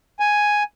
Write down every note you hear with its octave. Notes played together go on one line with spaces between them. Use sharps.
G#5